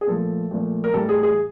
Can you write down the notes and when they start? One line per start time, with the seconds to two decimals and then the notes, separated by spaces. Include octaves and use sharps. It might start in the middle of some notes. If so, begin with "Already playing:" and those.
0.01 G#4
0.07 A#2 F3 A3 A4
0.51 A#2 F3 A3
0.84 A#4
0.94 A2 E3 G3 A4
1.09 G#4
1.23 G#4